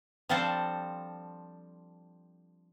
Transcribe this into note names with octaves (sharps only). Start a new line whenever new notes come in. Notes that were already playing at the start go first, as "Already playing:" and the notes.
F3 G3 C4 D4 A4 C5